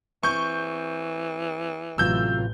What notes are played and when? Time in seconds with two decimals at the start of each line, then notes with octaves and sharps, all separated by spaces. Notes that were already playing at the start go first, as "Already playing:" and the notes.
0.23 E3 C4 C#6 G6
1.98 A1 C3 F#3 F4 E6 G6